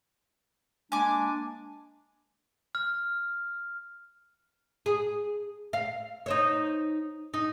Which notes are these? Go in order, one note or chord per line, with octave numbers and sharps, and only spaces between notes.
G#3 A#3 D4 G#5 D6
F6
G#4
F5
D#4 C5 C#5
D#4